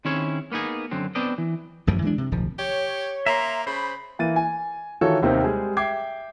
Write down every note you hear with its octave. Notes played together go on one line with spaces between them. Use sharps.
D#3 C4 C#4 E4 G#4 C#5
A#3 B3 D#4 G#4
F#2 D3 F#3 C4
B3 C4 D4 D5 D#5
E3
A1 F#2 D#3 F3
E3 G#3 A#3 D4
C3
D1 B1 D#3 F3
G4 C#5
A#3 E5 A#5 C6
C#3 C5 B5
E3 A#3 A6 D#7
G#5
D#3 E3 F4 F#4 A4 C#5
D#2 C3 A#3 C4 D#4
G3 G#3 G#4 C5
E5 G5 D6 G#6 C7